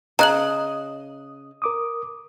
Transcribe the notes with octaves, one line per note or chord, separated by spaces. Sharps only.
C#3 D#5 A#5 F#6 F#7
A#4 D6 D#6